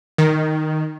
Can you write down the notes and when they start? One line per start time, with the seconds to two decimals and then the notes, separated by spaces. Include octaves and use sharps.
0.18 D#3